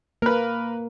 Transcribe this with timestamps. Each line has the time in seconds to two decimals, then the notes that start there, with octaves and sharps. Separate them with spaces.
0.22 A#3 A#4 B4